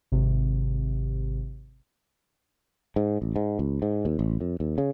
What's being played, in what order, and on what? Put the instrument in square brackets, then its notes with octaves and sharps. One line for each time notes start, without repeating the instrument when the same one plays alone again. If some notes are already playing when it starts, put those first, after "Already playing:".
[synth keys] G#1 C3
[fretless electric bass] G#2
A1
G#2
C#2
G#2
D#2
A1
F2
D#2
C#3